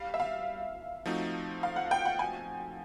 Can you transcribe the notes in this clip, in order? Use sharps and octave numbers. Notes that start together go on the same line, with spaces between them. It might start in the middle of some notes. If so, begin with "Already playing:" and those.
Already playing: G3 F5
E5
F5
F3 A3 C4 D#4 F#4
F5
F#5
G5
F#5
G#5